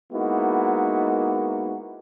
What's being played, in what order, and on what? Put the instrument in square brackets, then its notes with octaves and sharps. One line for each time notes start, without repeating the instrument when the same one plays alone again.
[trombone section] G#3 A#3 B3 D#4 E4 F#4